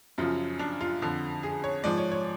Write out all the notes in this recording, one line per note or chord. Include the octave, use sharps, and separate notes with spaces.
F#2 C#3 F3 F4
D4
F4
F2 D3 F3
G#4
C#5
G#2 F3 D5
C#5
C#5